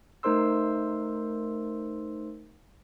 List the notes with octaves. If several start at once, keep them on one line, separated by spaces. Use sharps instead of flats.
A3 D#4 A#4 C5 C6 E6